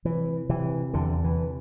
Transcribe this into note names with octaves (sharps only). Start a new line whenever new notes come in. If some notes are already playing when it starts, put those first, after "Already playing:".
C3 E3
C3 E3
E2 D3
E3